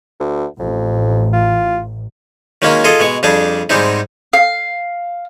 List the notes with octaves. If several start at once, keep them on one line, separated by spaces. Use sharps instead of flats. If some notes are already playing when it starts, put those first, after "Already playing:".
D2
A1 F2
F4
D#3 F#3 G#3 A#3 C#4
F4 G#4 A4 D#5
B2 G#3 C#6
F2 G3 D4 G#4 A5
G#2 G3 G#3 C4 D#4
F5